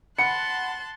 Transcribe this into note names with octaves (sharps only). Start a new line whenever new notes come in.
F#5 A5 B5 C6 F#6 C#7